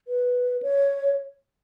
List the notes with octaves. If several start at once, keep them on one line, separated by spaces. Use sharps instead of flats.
B4
C#5